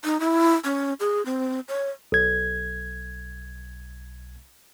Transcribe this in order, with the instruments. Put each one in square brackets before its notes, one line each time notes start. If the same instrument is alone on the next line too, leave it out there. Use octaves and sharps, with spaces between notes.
[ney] D#4
E4
C#4
G#4
C4
C#5
[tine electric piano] B1 G#6